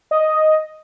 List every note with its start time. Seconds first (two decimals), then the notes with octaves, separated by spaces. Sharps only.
0.11 D#5